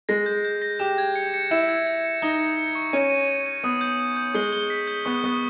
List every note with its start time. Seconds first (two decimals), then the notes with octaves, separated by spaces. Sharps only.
0.09 G#3 A#6
0.26 G6
0.45 G6
0.62 A#6
0.79 G4 E7
0.98 G#6
1.16 C#7
1.34 C#7
1.51 E4 E7
1.69 G#6
1.87 G#6
2.05 C#7
2.22 D#4 C#7
2.40 C#7
2.57 C#7
2.75 C#6
2.93 C#4 D#7
3.10 D#7
3.28 D#7
3.46 D#7
3.64 B3 D#6
3.81 G6
4.00 D#6
4.16 G6
4.34 G#3 G7
4.53 G7
4.70 B6
4.87 G6
5.05 B3 C#6
5.24 B3 C#6